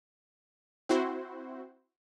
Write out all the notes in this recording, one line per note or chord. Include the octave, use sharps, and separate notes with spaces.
C4 E4 F#4 C5